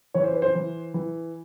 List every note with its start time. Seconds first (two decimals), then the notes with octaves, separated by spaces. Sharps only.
0.14 E3 C#5
0.24 C5
0.33 B4
0.42 C5
0.55 E3
0.94 E3